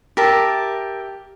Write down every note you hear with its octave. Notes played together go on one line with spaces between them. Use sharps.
G4 A#4 E5 A5